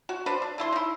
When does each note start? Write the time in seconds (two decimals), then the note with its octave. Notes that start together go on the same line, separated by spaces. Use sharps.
0.09 F#4
0.26 D4 B4 C5
0.42 D4
0.58 D3 E4 C6
0.72 D#4 E4